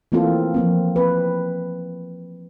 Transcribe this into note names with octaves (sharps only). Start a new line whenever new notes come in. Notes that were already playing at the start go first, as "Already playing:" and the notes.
E3 A3 A#3 C4 F4 A4
F3 A#3 C4
C4 B4